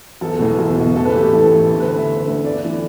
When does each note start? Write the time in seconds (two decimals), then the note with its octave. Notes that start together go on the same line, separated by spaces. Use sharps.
0.21 E1 A4
0.39 E2 B2
0.59 E1
0.76 E2 B2
0.95 A1 A4
1.05 B4
1.14 A2 E3 A3 G4
1.33 A1 A4
1.51 A2 E3 A3
1.69 D2 A4
1.80 B4
1.88 D3 A3
1.98 E5
2.07 D2
2.25 D3 A3
2.44 G1 D5
2.63 E3 A3